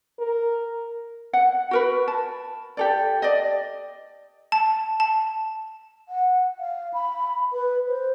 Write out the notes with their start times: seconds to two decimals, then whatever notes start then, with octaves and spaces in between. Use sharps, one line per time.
0.19 A#4
1.33 F#5
1.71 F#4 A#4 B4
2.08 A5
2.77 G4 A4 D5
3.22 D5 D#5
4.52 A5
5.00 A5
6.09 F#5
6.60 F5
6.94 B5
7.53 B4
7.88 C5